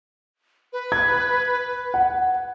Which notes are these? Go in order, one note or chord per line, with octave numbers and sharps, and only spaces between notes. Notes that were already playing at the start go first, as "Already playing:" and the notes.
B4
G#6
F#5